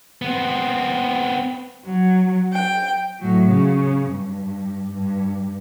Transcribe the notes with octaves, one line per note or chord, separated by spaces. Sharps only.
B3 C4
F#3
G5
A2 F#3
C#3
G2
G2